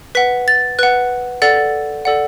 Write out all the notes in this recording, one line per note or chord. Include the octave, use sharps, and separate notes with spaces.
B4 F#5 B6
A6
B4 F#5 F#6
A4 D5 F#5 A6
A4 D5 F#5